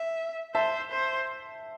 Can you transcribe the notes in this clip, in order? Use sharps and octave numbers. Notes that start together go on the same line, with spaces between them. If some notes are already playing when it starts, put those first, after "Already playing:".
Already playing: E5
C5 E5 A5
C5